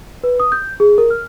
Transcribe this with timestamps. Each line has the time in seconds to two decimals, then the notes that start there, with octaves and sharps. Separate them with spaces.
0.24 B4
0.40 D#6
0.52 G6
0.80 G#4
0.98 A#4
1.10 F6